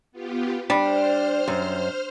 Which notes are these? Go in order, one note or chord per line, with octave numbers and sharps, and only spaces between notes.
B3 F4 G4
G3 D4 C5 F6
F#2